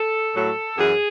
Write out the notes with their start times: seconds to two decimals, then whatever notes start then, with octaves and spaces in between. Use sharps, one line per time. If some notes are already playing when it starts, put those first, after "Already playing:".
Already playing: A4
0.35 A2 F#3 A4
0.78 F#2 E3 G#4